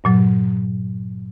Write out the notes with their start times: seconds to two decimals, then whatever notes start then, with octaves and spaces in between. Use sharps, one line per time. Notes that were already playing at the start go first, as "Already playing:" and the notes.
0.04 G2 A#2 F#3